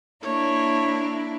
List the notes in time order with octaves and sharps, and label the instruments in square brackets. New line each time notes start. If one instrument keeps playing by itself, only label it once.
[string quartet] A#3 D4 E4 [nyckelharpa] C#5